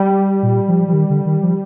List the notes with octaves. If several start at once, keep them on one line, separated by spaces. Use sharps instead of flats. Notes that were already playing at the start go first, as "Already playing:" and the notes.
Already playing: G3
A#2
F3
F3
D#3
D3
D#3
F3